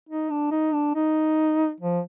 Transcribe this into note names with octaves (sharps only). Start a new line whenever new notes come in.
D#4
D4
D#4
D4
D#4
F3